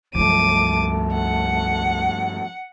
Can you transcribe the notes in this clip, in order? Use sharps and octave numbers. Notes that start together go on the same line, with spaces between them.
C#2 G2 F3 F#3 A3 D6 D#7
F#5